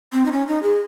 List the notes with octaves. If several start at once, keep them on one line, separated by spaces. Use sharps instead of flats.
C4
D#4
C#4
D#4
G#4